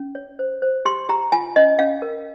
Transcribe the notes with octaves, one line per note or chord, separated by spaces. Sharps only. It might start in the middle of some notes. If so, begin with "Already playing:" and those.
Already playing: C#4
C#5
C5
C5
G4 C6
G4 A#5
F4 G#5
C#4 D#5
C#4 F5
A#4